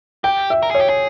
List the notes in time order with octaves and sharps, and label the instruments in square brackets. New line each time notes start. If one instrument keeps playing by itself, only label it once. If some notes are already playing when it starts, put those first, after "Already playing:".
[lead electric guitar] G4 [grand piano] G5
[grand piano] E5
[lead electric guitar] A#4
[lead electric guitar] G#4 [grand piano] C#5
[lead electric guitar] G4
G#4